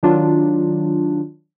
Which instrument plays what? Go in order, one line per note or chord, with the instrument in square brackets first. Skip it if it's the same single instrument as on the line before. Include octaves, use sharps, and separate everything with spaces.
[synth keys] D#3 F#3 D4 F4